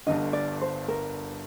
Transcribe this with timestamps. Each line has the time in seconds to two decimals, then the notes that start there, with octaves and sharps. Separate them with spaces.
0.07 G1 G2 D3 D#5
0.33 D5
0.61 C5
0.88 A#4